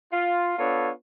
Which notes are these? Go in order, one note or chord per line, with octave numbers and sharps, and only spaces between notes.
F4
B3 D4 F4 A4 C#5